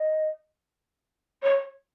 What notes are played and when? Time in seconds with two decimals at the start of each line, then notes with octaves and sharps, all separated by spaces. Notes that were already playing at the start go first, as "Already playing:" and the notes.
Already playing: D#5
1.43 C#5